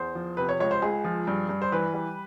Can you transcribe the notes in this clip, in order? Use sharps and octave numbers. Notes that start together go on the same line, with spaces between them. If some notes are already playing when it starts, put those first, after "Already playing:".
Already playing: E2 C5
F3
C3 B4
C#5
C#2 C#5
C5
C#2 G#4
F3
G2
G2
C5
E3 B4
G3